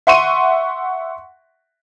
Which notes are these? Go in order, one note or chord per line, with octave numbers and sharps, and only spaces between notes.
E5 F#5 C6 C#6 D#7